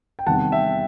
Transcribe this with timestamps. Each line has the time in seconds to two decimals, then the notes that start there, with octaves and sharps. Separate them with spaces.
0.19 G5
0.26 E2 C3 D#3 G3 F#5 A5
0.52 E5 G5